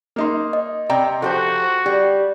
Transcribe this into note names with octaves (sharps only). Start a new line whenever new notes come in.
A#3 D#4 C6
D#5
C3 D5 G5 A#5
F3 F#4 G4 A4 C5
G3 G4